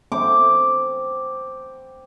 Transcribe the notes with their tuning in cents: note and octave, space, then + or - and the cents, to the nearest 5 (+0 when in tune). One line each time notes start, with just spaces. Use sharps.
C4 +0 D6 +0